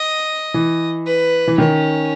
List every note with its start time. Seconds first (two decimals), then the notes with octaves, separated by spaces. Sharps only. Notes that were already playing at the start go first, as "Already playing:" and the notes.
Already playing: D#5
0.54 E3
1.06 B4
1.48 E3
1.58 D#3 C#4